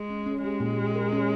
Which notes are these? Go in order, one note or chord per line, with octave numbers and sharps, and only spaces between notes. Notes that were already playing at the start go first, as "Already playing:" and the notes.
Already playing: G#3
C#4
C#4
G#3 G4
A#2
G4
A#4
C#4